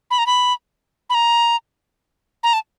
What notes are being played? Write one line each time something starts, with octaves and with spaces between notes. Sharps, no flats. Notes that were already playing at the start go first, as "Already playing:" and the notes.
B5
A#5
B5
B5
A#5
A#5
A5